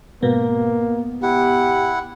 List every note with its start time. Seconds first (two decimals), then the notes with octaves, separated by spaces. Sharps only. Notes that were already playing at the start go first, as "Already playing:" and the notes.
0.23 G#2 B2 A#3 B3
1.22 E4 G4 F#5